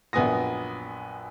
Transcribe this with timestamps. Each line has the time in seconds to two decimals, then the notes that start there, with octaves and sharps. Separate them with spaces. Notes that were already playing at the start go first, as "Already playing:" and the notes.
0.13 A#1 F#2 B3 G#5 D#6 A#6